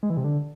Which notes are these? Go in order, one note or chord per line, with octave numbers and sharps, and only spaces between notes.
G#3
E3
C3
D3